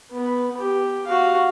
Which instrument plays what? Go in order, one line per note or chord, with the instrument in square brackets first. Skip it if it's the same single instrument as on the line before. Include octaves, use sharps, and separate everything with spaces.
[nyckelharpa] B3 B4
G4
F#4 F5